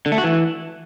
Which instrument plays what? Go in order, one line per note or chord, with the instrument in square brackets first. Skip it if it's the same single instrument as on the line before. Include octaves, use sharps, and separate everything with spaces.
[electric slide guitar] D3
A3
F#4
E3